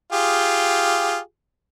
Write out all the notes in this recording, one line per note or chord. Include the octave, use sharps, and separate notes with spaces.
F4 G4 G#4